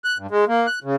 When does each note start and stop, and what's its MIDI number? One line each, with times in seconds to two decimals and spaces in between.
0.04 0.18 90
0.18 0.27 43
0.31 0.45 56
0.48 0.67 58
0.67 0.79 90
0.84 0.96 49